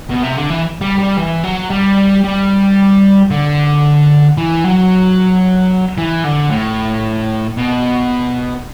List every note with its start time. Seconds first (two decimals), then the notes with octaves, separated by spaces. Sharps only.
0.10 B2
0.24 C3
0.36 D3
0.50 E3
0.81 G3
0.99 G3
1.17 E3
1.43 F#3
1.70 G3
2.24 G3
3.31 D3
4.37 E3
4.64 F#3
5.98 E3
6.24 D3
6.50 A2
7.57 B2